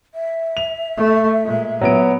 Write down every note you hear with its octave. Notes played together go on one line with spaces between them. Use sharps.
E5
F7
A3
A#2 G#3
A#2 F#3 B3 D7